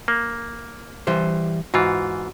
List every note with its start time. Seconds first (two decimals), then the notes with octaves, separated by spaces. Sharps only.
0.08 A#3
1.07 E3 G3 C5
1.74 G#2 E3 F4 F#4